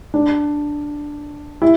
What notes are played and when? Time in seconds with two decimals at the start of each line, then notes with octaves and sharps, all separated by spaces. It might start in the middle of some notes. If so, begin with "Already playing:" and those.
0.14 D4
1.62 E4